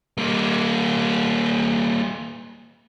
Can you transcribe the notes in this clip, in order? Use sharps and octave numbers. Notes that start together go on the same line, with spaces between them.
G3 A#3